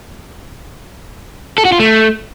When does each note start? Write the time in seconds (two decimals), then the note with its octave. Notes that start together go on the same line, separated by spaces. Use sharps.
1.58 A4
1.65 F#4
1.72 F4
1.79 A3